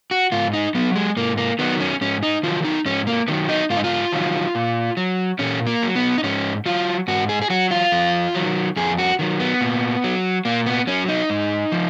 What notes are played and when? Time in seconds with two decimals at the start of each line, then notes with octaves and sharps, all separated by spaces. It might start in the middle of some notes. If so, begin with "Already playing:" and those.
0.11 F#4
0.32 G#2 F4
0.53 D#4
0.75 F#3 B3
0.96 G#3
1.17 G#2 A#3
1.38 A#3
1.59 D#3 F#3 B3
1.80 C#4
2.01 G#2 C#4
2.23 D#4
2.43 D#3 F#3 F4
2.64 D#4
2.85 G#2 C#4
3.07 A#3
3.28 D#3 F#3 B3
3.49 D#4
3.70 G#2 F4
3.77 D#4
3.84 F4
4.12 D#3 F#3
4.55 A#2
4.97 F#3
5.39 A#2 C#4
5.67 A#3
5.82 F#3
5.96 B3
6.18 D#4
6.23 G#2 C#4
6.66 F#3 F4
7.08 G#2 F#4
7.29 G#4
7.42 G#4
7.50 F#3 F#4
7.71 F4
7.92 F2
8.35 D#3 F#3
8.76 F2 G#4
8.98 F#4
9.19 D#3 F#3
9.40 B3
9.61 A#2
10.04 F#3
10.45 A#2 A#3
10.66 B3
10.87 F#3 C#4
11.08 D#4
11.30 G#2
11.72 F3